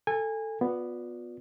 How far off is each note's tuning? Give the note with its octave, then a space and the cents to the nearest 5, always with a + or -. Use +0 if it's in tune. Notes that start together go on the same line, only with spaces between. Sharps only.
A4 +10 G#5 -25
B3 +0 F4 +40 D5 +0